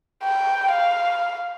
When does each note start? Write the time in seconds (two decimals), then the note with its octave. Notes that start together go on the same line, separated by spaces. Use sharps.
0.23 G5
0.72 F5